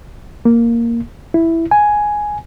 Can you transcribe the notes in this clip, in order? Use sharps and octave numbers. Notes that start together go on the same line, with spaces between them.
A#3
E4
G#5